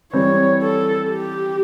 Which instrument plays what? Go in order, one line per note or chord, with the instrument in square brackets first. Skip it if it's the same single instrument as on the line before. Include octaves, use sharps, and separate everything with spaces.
[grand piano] E3 G3 C4 [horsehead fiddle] C#5
[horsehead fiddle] A4
G4